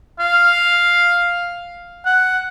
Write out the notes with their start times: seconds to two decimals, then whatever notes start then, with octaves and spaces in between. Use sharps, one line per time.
0.20 F5
2.06 F#5